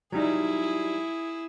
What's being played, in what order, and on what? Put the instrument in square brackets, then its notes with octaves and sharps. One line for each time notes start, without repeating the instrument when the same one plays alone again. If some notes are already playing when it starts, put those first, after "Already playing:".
[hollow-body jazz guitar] F#3 G3 D#4 [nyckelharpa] E4 G#4